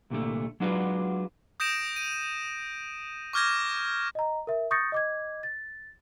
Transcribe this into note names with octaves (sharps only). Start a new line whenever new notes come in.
C2 A#2 D3 A3
F#3 G#3 D4 F4 F#4 B4
D#6 G6 A#6 D7 E7
D#7
C#6 D6 F6 G6 G#6 A#6
D#5 A#5
A#4 E5
C#6 D#6 G6 A6 A#6 C#7
D#5 D6 G#6
A6